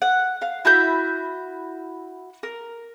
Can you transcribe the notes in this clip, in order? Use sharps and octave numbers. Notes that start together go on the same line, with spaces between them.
F#5
F5
E4 F#4 B5 G6
A#4